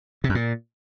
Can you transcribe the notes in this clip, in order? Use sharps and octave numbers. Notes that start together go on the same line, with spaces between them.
C3
F#2
A#2